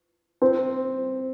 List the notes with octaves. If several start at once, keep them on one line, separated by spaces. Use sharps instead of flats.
C4